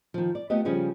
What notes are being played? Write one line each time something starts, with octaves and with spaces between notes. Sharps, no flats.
D#3 F3
D5
A3 B3 F4 G4 D#5
C#3 F3 G3 C#4 F4 G#4